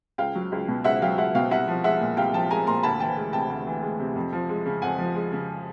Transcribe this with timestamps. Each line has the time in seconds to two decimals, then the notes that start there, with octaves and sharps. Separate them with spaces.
0.18 C#2 F5 G5
0.35 F#3
0.52 C#2
0.68 B2
0.84 C#2 E5 F#5
1.02 F#3 F5 G5
1.18 C#2 E5 F#5
1.35 B2 F5 G5
1.51 C2 E5 F#5
1.68 F3
1.84 G#3 E5 F#5
2.01 A#2
2.17 C2 F5 G5
2.34 F3 G5 A5
2.51 G#3 G#5 A#5
2.67 A#2 A#5 C6
2.83 D2 A5 B5
3.00 E3 G5 A5
3.17 G#3
3.33 C3 G5 A5
3.50 D2
3.67 E3
3.82 G#3
3.99 C3
4.15 F2
4.33 F3
4.49 G#3
4.66 C#3
4.82 F2 F#5 G#5
4.98 F3
5.15 G#3
5.32 C#3